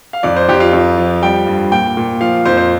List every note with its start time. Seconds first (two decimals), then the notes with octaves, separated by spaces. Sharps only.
0.13 F5
0.23 F2 D5
0.36 C5
0.49 F2 G4
0.60 F4
0.73 F2
0.98 F3
1.22 G3 G5
1.47 G2
1.71 A#2 G5
1.97 A#2
2.21 F3 F5
2.45 F2 C5
2.57 C5